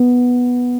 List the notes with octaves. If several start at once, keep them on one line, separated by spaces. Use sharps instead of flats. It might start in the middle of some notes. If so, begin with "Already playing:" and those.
Already playing: B3